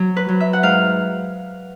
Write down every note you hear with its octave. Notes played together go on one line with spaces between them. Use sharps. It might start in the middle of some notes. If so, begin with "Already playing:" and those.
Already playing: F#3
B4
F#3
E5
F#5
G#2 F5